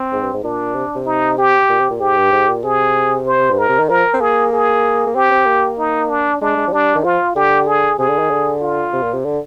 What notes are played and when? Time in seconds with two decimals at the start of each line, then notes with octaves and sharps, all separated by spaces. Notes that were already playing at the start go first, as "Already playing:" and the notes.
Already playing: C4
0.13 G#2
0.22 G2
0.34 G#2
0.44 A#2 D4
0.75 C3
0.96 C3
1.06 D#4
1.38 G4
1.69 A#2
1.80 C3
1.90 A#2
2.00 G#2 G4
2.17 G2
2.33 G#2
2.48 A#2
2.64 C3 G#4
3.27 C5
3.51 G2
3.58 G#2 A#4
3.69 C3
3.80 D#3
3.89 F3 A#4
4.14 C4
4.21 A#3 G#4
4.53 G#4
5.07 A#3
5.15 C4 G4
5.32 C4
5.47 A#3
5.79 D#4
6.09 D4
6.41 G#3 D4
6.57 G#3
6.68 F3
6.73 G3 D4
6.95 D#3
7.04 F3 F4
7.36 D3 G4
7.67 G#4
7.99 C3 G#4
8.09 D3
8.19 D#3
8.31 D3
8.61 F4
8.93 C3
9.03 A#2
9.14 C3
9.25 D3